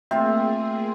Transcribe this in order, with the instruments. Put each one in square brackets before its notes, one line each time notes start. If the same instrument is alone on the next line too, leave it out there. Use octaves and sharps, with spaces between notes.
[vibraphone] A3 E6 [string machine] A#3 G#4 [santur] C4 F4 [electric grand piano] E5